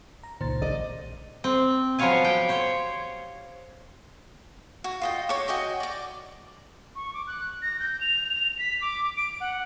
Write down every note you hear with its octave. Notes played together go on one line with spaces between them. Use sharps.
A#5
C#2 A#2 D#3 C5 A6
A#1 D5 D#5
C4
F3 F#3 B3 C#5 F5 G#5
G4 G5
C5 C#5
F#4
F4 D#5 G5
C#5 D6
F#4 D#5 G5 G#5
D5 D6
C#6
D6
F#6
A#6
G6
F7
F7
B6
D6
D7
F#5